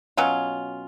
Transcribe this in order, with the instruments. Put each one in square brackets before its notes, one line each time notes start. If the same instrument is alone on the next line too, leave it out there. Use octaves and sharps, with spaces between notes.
[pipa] B2 F#3 C#4 F4